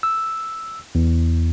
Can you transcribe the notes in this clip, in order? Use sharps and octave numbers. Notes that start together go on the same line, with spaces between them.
E6
E2